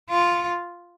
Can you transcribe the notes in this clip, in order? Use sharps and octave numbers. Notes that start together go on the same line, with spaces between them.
F4